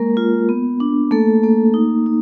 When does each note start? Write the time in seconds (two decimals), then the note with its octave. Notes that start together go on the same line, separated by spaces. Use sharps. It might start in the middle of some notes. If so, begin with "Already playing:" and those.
Already playing: G#3 A#3 A#4
0.17 F4
0.49 B3
0.80 D4
1.11 A3 A#3 A4
1.44 A#3
1.74 D#4
2.06 D#4